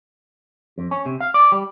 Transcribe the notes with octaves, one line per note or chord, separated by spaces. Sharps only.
F2
C#4
C3
F5
D5
G3